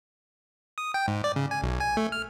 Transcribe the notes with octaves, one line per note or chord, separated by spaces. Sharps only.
D#6
G5
G#2
D5
C#3
G#5
B1
G#5
A3
F6